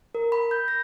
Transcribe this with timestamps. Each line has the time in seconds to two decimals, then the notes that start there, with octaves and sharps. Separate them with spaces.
0.15 A#4
0.32 B5
0.51 G6
0.68 A#6